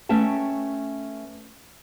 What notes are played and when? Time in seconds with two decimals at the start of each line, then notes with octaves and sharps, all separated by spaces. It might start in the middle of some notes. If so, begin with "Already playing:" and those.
0.09 A3 C#4 B4 E5 G5 A5